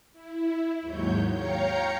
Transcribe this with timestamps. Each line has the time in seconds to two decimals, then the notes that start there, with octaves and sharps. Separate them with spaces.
0.13 E4
0.81 D#2 G#2 F#3 C#5 G6
1.31 C#5 F5 G5 A#5 G6 C#7